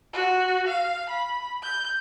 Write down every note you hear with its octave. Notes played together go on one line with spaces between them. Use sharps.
F#4
F5
B5
G6